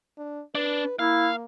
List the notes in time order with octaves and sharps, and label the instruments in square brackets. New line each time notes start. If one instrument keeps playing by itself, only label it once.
[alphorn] D4
[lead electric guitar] D4 [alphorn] B4
[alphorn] A#3 [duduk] E4 [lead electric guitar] F5